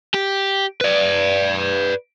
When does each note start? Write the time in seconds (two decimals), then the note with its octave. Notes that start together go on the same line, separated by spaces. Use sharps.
0.14 G4
0.81 B4 D5